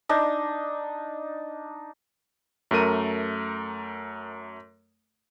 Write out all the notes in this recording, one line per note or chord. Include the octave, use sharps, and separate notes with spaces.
D4 D#4
F#2 A3 A#4 D#7